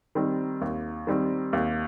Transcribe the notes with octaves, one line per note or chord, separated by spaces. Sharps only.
D#3 G3 C4
D#2
D#3 G3 C4
D#2